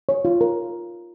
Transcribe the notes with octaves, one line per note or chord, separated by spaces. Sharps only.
C#5
F4
A#4